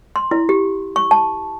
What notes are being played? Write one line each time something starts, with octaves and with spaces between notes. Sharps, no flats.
C6
E4
G4
C#6
A5